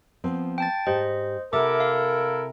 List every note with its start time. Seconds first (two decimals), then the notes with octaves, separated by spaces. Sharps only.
0.24 F3 B3 C4
0.58 G5 A5 A6
0.87 G#2 G4 C5 D#5
1.53 C3 E4 A4 A#4 E5 F#5 D6
1.80 F5